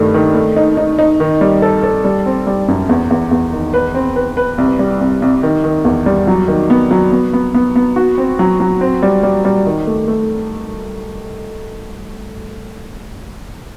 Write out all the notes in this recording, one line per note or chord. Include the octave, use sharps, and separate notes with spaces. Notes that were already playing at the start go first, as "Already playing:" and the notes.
Already playing: G2 D#3 A3
D#3
A3
D#4
D#4
D#4
D#3
G3
A4
A4
G3
C4
G3
F#2
E2
E2
E2
D#3
B4
C4
B4
B4
C2
G3
C2
C2
D#3
D#3
E2
G3
F#3
D#3
B3
F#3
B3
B3
B3
B3
F#4
C4
F#3
F#3
C4
G3
G3
G3
D#3
A3
A3